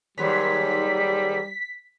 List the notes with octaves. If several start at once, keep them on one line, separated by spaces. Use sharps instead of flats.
D#2 G#2 F#3 G3 B6